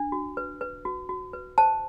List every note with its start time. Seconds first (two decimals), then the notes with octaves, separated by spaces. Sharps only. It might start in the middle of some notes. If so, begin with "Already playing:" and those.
Already playing: D4
0.12 F#4
0.37 B4
0.61 B4
0.85 F#4
1.09 F#4
1.33 B4
1.58 C5 A5